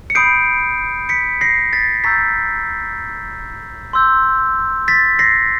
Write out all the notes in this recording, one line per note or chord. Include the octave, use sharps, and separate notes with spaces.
C#7
B5 D#6 G6 C7 D7
B6 C#7
A#6 C7
A6 B6
A#5 C#6 E6 G6 A6 B6
C6 E6 G6
A6 B6
A#6 C7